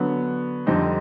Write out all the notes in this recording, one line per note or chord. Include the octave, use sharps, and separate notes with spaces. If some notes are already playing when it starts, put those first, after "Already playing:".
Already playing: D3 F#3 B3
F2 D3 G3 C4 D#4